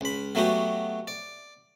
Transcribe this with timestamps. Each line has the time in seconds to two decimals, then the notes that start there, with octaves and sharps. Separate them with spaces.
0.01 C#2 B5
0.35 F#3 A3 B3 F#4 G4
1.07 D5